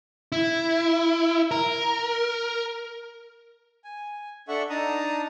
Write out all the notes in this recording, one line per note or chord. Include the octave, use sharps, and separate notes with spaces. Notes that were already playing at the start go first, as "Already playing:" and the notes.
E4
A#4
G#5
D4 A4 E5 F#5 C#6
D4 D#4 A5 A#5 D#6